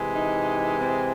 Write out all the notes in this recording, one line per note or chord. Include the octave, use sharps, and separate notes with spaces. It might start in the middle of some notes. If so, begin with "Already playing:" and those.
Already playing: C3 E3 G#3
D#4
C4